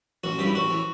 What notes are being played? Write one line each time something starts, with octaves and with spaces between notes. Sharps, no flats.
A1 F#4
G2 E3 G4
A1 F#4
E3